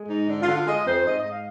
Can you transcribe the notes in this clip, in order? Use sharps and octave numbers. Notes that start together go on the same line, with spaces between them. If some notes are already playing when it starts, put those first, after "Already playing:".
Already playing: G#3
G#2 D#4
D3 D4
F4
D3
F4
G#3 D#5
F2 C5
G#2 D#5
D#5
G#2
F5